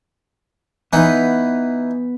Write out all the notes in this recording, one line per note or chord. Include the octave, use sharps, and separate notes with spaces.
E3 B3 D#4 B4